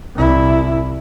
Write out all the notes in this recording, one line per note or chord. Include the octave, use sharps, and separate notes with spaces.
C2 E4